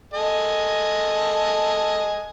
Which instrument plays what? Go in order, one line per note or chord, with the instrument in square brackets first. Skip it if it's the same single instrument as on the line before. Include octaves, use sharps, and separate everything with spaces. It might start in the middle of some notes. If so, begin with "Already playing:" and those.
[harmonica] A4 D#5 G#5